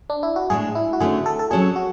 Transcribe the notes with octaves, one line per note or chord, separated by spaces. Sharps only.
D4
E4
F#4
A2 G#3 D4 G#4
E4
F#4
D3 A3 C#4 G#4
A4
A4
F#3 C#4 F#4 G#4 A4 C#5
F#4